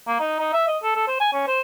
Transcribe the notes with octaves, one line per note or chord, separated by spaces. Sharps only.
A#3
D#4
D#4
E5
D#5
A4
A4
C5
G#5
C#4
C5